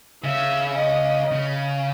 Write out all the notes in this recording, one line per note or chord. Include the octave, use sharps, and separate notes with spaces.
C#3 E5
D#5
C#3